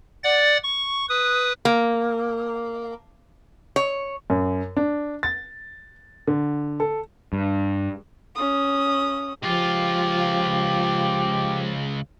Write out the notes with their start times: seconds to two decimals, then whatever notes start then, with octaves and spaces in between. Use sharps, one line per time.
0.24 D5 F#5 A6
0.64 C#6
1.09 B4 D#6
1.65 A#3
3.76 C#5
4.30 F#2
4.77 D4
5.23 A6
6.27 D3
6.80 A4
7.33 G2
8.35 C#4 D#6
9.44 C#2 F3 F4 G4